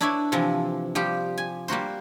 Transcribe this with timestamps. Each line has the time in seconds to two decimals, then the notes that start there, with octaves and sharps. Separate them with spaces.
0.01 D4 E4 B4 C#5 D5 E5
0.32 C3 E3 F3
0.95 F3 G3 G4
1.38 G#5
1.68 G3 A#3 F#4 C5